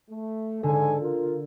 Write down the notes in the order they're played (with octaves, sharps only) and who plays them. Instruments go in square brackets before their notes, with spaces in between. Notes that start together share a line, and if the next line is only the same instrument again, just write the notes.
[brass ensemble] A3
[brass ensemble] G#2 G#5 [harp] D3 [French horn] A4
[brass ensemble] F4 [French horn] A#4